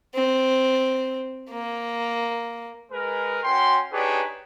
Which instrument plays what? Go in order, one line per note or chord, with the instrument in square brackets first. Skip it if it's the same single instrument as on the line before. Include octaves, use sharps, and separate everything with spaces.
[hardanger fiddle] C4
A#3
[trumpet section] G#3 A#4 B4
C#4 F#4 G5 C6
D4 D#4 G4 G#4 B4 C#5